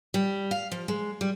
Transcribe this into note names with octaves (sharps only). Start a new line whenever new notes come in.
G3
F5
F3
G#3
G3